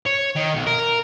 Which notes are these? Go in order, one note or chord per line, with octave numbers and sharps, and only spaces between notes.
C#5
D#3
B1
A#4